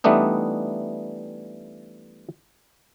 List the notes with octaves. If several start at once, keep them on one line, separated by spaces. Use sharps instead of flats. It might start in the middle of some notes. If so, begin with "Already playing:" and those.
E3 G3 A3 B3 D4 D#4